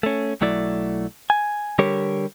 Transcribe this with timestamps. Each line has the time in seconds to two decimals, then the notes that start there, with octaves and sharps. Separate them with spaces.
0.03 A3 C#4
0.41 B1 F#3 A3 E4 D5
1.30 G#5
1.79 D3 G3 G4 A#4 C#5